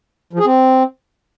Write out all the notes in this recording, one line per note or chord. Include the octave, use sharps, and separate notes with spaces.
F3
G#4
C4